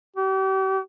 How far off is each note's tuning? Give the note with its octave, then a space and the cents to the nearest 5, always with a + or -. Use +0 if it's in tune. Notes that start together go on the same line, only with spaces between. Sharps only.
G4 -40